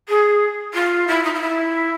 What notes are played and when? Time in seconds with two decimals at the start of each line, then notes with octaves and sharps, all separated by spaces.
0.08 G#4
0.74 F4
1.07 E4
1.23 D#4
1.34 F4
1.40 E4